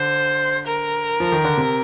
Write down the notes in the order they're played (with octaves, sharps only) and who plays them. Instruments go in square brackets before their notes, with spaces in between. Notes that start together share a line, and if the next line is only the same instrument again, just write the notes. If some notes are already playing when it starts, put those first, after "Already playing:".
Already playing: [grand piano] D3 [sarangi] C5
[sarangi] A#4
[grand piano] F3
D#3
D3
C3